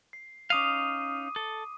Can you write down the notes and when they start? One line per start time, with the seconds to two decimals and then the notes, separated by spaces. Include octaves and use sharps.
0.13 C7
0.50 C#4 D#4 F5 D6 D#6 D#7
1.36 A4